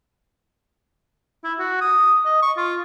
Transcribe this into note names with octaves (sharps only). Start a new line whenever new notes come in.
E4
F#4
D#6
D#5
C#6
F4